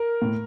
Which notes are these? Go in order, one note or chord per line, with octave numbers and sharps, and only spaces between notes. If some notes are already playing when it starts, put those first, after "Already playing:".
Already playing: A#4
A2